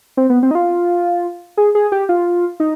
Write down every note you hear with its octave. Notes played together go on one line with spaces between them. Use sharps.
C4
B3
C4
D#4
F4
G#4
G#4
G4
F4
D#4